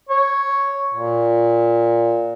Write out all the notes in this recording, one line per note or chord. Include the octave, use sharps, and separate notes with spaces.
C#5
A#2